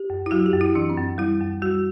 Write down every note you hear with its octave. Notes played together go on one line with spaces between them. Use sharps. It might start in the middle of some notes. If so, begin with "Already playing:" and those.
Already playing: G4
F#2
E4
F#3 F#4
G4
F#2
E4
E3 D4
C4
F#2
G3 E4
F#2
G3 F#4